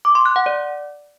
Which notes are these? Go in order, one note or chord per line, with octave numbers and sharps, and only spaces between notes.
D6
C6
F#6
F#5
D5